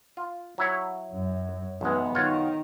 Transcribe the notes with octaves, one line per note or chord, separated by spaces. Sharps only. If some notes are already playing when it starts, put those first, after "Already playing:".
F4
F#3 E4 C#5
F#2
B1 E3 G#3 B3
D#3 F4 F#4 C#5